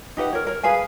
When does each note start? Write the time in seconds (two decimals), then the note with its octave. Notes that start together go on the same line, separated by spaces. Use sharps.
0.17 D#4 G4 B4 F#5
0.33 A#4 C#5
0.47 A#4 C#5
0.63 G#4 B4 F5 G#5